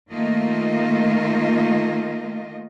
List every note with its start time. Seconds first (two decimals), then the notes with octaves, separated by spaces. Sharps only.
0.13 D#3 A3 A#3 F4 D#5